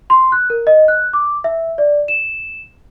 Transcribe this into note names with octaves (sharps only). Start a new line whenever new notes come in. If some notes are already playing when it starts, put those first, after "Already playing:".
C6
F#6
A#4
D#5
F#6
D6
E5
D5
E7